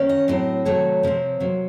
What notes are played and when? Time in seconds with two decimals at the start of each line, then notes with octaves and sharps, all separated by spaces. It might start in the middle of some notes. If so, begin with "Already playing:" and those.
Already playing: D#3 A#3 C#4
0.09 D#5
0.28 A2 F#3 C4 D#5
0.65 C3 D#3 F#3 A3 C#5
1.03 C3 F3 C4
1.40 C3 F#3 A#3